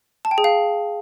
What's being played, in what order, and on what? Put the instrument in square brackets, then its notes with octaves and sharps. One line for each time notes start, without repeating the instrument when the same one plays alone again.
[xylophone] A5
G5
G#4
F5